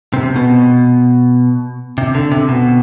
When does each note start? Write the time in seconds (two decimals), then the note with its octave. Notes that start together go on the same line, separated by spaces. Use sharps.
0.14 C3
0.36 B2
1.98 C3
2.15 D3
2.32 C3
2.49 B2